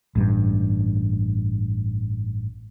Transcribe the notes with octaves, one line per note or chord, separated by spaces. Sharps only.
A1 G2